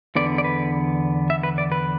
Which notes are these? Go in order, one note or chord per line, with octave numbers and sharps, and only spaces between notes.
E2 D3 B3 D5
D5
B4
E5
B4
D5
B4